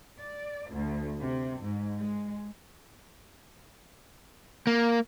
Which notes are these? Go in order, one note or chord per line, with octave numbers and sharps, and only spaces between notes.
D5
D2
C3
G#2
G#3
A#3